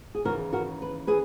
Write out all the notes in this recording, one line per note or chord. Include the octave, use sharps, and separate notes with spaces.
G#4
D#2 C#3 E3 F#4 A#4
F#4 A#4
B4
G#4 B4